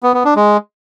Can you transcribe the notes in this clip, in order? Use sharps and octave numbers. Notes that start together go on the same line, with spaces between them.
B3
B3
D4
G#3